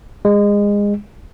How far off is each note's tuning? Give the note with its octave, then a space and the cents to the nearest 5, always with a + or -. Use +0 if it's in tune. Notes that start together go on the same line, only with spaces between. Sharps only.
G#3 -25